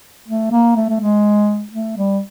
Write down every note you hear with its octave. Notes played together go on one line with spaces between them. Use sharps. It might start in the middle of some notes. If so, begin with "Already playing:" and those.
A3
A#3
A3
A3
G#3
A3
G3